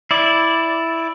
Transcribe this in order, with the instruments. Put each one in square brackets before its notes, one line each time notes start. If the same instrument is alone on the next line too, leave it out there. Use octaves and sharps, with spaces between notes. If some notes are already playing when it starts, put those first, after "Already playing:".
[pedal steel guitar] E4 D5